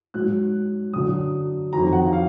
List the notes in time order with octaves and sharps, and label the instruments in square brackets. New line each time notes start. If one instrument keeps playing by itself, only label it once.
[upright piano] G#2 F#3 F#6
F#2 D3 F#3 D#6
F2 D#3 F#3 A#5
F#5
F5